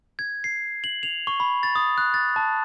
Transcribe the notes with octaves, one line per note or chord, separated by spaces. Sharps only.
G#6
C7
F#7
F7
C#6
B5
A6
D#6
F#6
A6
A5